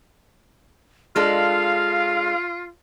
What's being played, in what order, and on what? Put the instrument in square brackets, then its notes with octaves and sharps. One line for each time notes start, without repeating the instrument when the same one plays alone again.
[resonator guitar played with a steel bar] G#3 D4 A4 [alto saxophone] F4 [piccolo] F5